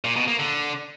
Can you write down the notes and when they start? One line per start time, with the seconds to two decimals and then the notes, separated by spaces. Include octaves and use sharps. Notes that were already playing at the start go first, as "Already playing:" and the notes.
0.04 A#2
0.16 B2
0.28 A#3
0.39 D3